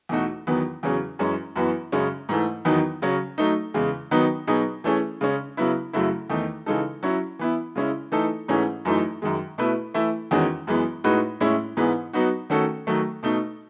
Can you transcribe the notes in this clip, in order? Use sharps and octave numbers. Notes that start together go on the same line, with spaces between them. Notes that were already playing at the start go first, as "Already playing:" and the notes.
E2 B2 A3 D#4 F#4
E2 D#3 F#3 B3
E2 C#3 F#3 C#4 G#4
F#2 E3 G#3 C#4
F#2 E3 B3 F#4
F#2 C#3 G#3 C#4
G#2 E3 A3
E2 D#3 F#3 B3 D#4
C#3 F#3 C#4
F#3 A3 D#4
E2 C#3 G#3
D#3 F#3 B3 D#4
B2 F#3 B3 D#4 G#4
E3 A3 C#4 G#4
C#3 G#3 C#4
C#3 F#3 B3 E4
F#2 C#3 F#3 A3 E4
E2 D#3 A3 D#4
C#3 E3 G#3 D#4 A4
F#3 C#4 E4
E3 B3 E4
C#3 G#3 C#4 E4
E3 A3 D#4 A4
G#2 E3 A3 C#4 G#4
F#2 E3 A3 D#4
F#2 D#3 G#3
B2 A3 E4 B4
E3 A3 E4
E2 D#3 G#3 C#4 F#4
F#2 E3 G#3 B3
A2 G#3 D#4 F#4 B4
A2 G#3 C#4 E4
G#2 E3 G#3 B3
F#3 B3 D#4 F#4
D#3 A3 C#4 F#4 A4
D#3 F#3 A3
B2 A3 D#4